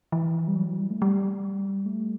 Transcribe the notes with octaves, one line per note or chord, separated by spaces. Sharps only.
E3
G3
F#3
G3
A3
G3
A3